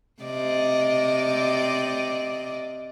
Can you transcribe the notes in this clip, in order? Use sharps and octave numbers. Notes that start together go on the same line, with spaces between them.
C3 D5 D#5